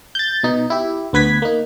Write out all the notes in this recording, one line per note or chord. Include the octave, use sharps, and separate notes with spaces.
G6 A6
B2 D#4
E4 G4
D2 B3 B4 G#6 B6
A#3 D#4